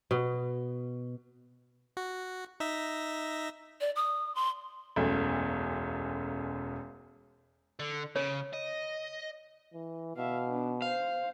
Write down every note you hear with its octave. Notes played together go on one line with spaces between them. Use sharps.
B2
F#4
D#4 E5 A#6
D5
D#6
C6
E1 B1 F#2 A3
D3
C#3 C#5
D#5
E3
B2 E5 F5
B3 D4
C5 F5